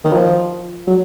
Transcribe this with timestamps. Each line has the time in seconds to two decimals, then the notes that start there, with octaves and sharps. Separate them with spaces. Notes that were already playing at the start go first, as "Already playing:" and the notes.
0.05 D#3
0.13 F3
0.87 F#3